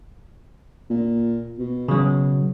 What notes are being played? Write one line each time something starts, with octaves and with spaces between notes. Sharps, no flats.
A#2
B2
C#3 F#3